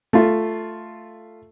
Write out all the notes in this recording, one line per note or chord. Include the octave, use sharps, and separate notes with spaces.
A3 F4